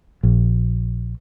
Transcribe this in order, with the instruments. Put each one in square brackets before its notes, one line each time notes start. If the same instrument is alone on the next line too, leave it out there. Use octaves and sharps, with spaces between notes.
[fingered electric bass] A#1